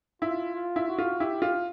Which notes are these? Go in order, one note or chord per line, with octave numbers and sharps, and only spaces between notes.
E4 F4
F4
E4
F#4
F4
E4 G4
F4